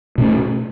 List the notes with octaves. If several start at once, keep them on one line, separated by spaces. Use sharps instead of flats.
B2 A3 C#4